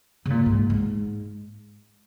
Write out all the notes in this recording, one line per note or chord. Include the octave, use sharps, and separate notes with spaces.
C#3
A#2
G#2
G#2